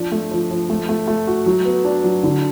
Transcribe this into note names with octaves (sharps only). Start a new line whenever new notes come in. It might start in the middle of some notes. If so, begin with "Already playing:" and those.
Already playing: F3 D4
A3
F3
F3
A3
A3
A3
F#4
F#3
B3
D4
F#3
D3